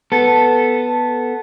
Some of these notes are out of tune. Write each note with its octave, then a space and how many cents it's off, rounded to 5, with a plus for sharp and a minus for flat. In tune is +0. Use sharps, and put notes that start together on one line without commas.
B3 +0 A4 +0